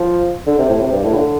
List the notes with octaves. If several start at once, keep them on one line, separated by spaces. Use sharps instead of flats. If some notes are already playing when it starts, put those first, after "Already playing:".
Already playing: F3
D3
C3
A2
C3
G2
A2
D3